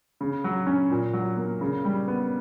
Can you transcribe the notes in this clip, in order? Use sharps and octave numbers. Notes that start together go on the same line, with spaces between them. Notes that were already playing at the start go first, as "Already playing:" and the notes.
C#3
F#3
C#4
A#2
F#3
A#3
C#3
G3
B3